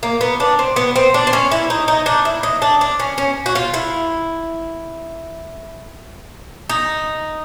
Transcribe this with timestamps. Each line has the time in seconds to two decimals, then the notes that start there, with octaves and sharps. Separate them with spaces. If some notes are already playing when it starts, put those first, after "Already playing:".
0.03 A#3
0.21 B3
0.40 D4
0.59 C4
0.76 B3
0.96 C4
1.14 D4
1.27 C4
1.33 C#4
1.52 E4
1.70 D#4
1.88 D#4
2.06 D4
2.25 E4
2.43 D#4
2.62 D4
2.81 D4
3.00 C#4
3.18 C#4
3.46 F#4
3.55 F4
3.74 E4
6.69 D#4